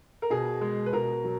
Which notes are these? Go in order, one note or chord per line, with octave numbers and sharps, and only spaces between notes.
A#4
B2 G#4
G#3
B4
B2 A#4
F#3